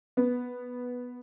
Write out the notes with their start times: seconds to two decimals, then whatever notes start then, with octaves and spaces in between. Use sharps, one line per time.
0.17 B3